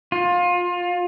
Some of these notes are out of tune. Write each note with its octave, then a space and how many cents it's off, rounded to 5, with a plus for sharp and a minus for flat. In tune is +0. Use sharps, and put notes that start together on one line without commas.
F4 +25